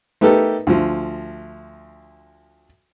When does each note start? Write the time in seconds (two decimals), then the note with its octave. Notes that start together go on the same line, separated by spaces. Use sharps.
0.21 A3 B3 D#4 G4 A4 A#4
0.67 D2 F3